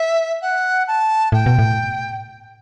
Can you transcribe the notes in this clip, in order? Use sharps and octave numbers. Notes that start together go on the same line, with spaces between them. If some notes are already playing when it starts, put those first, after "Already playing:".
Already playing: E5
F#5
A5
A2 G5
B2
A2